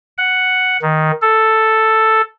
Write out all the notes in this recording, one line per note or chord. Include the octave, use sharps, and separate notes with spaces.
F#5
D#3
A4